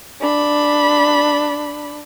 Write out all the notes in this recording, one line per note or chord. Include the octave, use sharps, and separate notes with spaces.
D4 B5